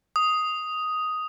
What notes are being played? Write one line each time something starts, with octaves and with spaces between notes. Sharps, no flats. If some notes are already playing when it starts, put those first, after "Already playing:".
D#6